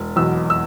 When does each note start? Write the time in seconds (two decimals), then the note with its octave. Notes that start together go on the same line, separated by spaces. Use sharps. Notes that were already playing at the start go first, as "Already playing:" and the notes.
Already playing: E1
0.16 E2 B2 F#3 E6
0.50 E6